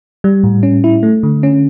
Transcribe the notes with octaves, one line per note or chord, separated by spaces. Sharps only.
G3
A2
C#4
E4
A3
D3
C#4